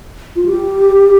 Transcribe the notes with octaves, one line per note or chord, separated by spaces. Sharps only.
F4
G4